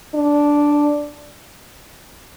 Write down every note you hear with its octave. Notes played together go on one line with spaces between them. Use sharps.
D4